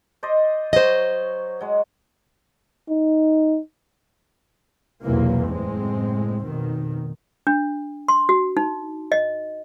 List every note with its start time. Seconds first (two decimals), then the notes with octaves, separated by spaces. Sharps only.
0.23 C5 D5 D#5
0.73 F#3 C5 C#5 D#5
1.61 F#3 G#3
2.89 D#4
5.02 B1 E2 C3 E3 F#3 A#3
5.48 F#1 A2 G#3 C4
6.43 F1 B2 D#3
7.47 D4
8.08 C6
8.29 F#4
8.57 D#4
9.12 D#5